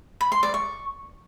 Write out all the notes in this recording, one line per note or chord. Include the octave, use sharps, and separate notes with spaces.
B5
C6
D5
C#6